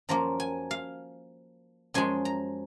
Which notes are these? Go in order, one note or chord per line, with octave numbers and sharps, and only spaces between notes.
F#2 F3 A#3 A#5
G#5
F5
F#2 F3 G#3 G#5
A#5